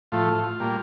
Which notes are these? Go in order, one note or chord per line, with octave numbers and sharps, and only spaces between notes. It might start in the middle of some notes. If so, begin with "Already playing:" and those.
A2 F3 A3 F4
F4
F4
A#2 G3 A#3